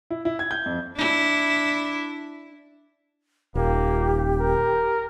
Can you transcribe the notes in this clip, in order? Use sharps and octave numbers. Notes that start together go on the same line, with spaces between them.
E4
E4
G#6
G6
F2
D4 E4
D#1 A#3 G4
A#4